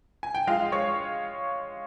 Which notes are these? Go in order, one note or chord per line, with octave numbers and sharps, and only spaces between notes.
G#5
G5
G#3 F4 F5
G#3 C#5 C#6